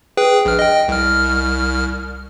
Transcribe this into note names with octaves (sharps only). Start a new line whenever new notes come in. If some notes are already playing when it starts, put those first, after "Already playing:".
G#4 B4 G5
A#1 F6
D#5 G5
C2 F6